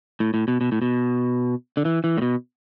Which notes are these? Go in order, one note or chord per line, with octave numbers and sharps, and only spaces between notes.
A2
A2
B2
B2
A2
B2
D3
E3
E3
A2
B2